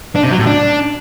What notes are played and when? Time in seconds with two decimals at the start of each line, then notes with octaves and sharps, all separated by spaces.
0.16 D4
0.23 C3
0.31 F#3
0.39 A2
0.47 D4